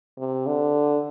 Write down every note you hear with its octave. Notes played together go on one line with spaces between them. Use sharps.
C3
D3